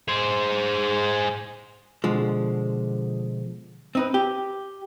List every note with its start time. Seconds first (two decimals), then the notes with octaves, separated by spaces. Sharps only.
0.08 G#4 C5
2.04 B2 D3 F3 G#3
3.95 C4 D#4 B4
4.14 G4